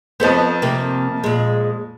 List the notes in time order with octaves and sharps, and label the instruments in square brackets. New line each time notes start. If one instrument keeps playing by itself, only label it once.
[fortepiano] F2 C5 [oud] B3 A4 D#5
[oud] C3 A#3
A#2 G#3